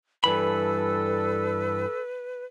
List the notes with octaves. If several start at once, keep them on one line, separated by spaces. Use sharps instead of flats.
G2 E3 A4 B4 B5 E6